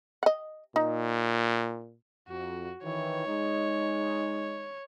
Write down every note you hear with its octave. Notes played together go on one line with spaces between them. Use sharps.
D#5 F#5
A#2 D#4
F2 F#4
D#3 E3 C#5
G#3 D#4